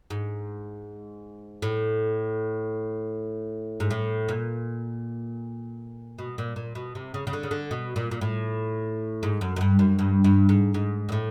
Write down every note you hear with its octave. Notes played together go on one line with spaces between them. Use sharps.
G#2
A2
G#2
A2
A#2
B2
A#2
A#2
B2
C3
C#3
C#3
D3
C#3
D3
B2
A#2
A#2
A2
G#2
F#2
F#2
G2
F#2
G2
G2
G#2
G#2
A#2
A2